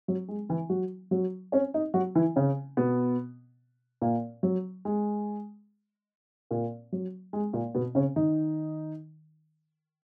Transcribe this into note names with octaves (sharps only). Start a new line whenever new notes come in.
F#3
G#3
E3 E4
F#3 F#4
F#3 F#4
C#4 C#5
D#4 D#5
F#3 F#4
E3 E4
C#3 C#4
B2 B3
A#2 A#3
F#3
G#3
A#2 A#3
F#3
G#3
A#2 A#3
B2 B3
C#3 C#4
D#3 D#4